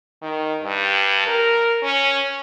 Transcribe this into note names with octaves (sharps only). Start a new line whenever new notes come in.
D#3
G2
A#4
C#4